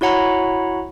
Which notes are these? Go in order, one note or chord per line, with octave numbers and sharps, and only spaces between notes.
E4 F#4 C#5 F#5 A#5 B5